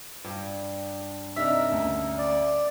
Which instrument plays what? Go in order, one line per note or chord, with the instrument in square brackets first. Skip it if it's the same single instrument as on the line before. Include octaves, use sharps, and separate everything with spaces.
[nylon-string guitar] G2
[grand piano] C3 D4 D#4 [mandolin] A#4 E5
[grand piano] D2 C#4 A5
[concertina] D5